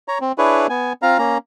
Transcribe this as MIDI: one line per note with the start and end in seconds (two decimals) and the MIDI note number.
0.08 0.18 73
0.08 0.18 82
0.21 0.32 60
0.38 0.67 62
0.38 0.67 64
0.38 0.67 68
0.38 0.67 71
0.38 0.67 73
0.69 0.93 59
0.69 0.93 80
1.02 1.18 60
1.02 1.18 65
1.02 1.18 77
1.02 1.18 82
1.19 1.38 58
1.19 1.38 61
1.19 1.38 82